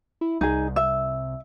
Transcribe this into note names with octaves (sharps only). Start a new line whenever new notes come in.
E4
C2 D#4 G#4
E5